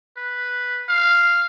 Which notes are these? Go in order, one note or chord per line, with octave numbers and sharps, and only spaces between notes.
B4
F5